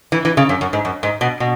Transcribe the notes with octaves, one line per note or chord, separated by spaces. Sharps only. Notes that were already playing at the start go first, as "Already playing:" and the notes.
E3
E3
C#3
F#2
F#2
G#2
F#2
G#2
B2
B2